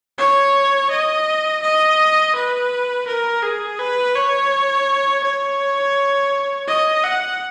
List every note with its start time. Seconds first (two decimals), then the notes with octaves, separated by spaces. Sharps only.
0.18 C#5
0.90 D#5
1.62 D#5
2.35 B4
3.07 A#4
3.42 G#4
3.79 B4
4.15 C#5
5.23 C#5
6.67 D#5
7.04 F#5